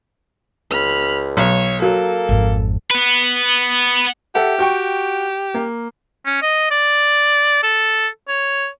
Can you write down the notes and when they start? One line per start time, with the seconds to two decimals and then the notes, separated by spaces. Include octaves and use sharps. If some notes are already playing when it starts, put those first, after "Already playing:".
0.71 C#2 B5 F6
1.37 B1 C#5
1.82 F#3 A#3 A4
2.29 G#1 F2
2.91 B3 B4
4.35 G4 A4 E5 F#5
4.59 F#4 G5 C#6
5.54 A#3
6.25 C#4
6.42 D#5
6.71 D5
7.63 A4
8.28 C#5